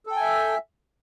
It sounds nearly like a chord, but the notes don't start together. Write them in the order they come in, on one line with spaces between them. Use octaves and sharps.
A4 G5 G#5 E5